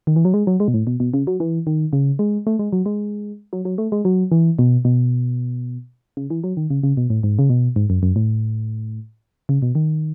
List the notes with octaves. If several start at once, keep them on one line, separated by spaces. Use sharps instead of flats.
D#3
E3
F#3
G#3
F#3
G#3
B2
A2
B2
B2
C#3
F#3
E3
D#3
C#3
G#3
A3
G#3
F#3
G#3
F#3
F#3
A3
G#3
F#3
E3
B2
B2
C#3
E3
F#3
D#3
C#3
C#3
B2
A2
G#2
C#3
B2
G#2
F#2
F#2
A2
C#3
B2
D#3